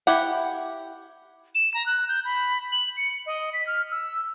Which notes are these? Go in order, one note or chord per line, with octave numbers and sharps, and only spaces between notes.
E4 G4 F#5
E7
A#5
F#6
G6
B5
F#7
C#7
D#5
B6
F6
E6